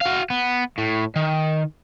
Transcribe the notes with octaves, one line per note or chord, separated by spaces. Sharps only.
F#4 F5
B3
A2
D#3